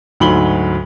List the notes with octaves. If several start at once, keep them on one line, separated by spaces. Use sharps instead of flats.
D2 G#2 F#3 B5 F#7 G7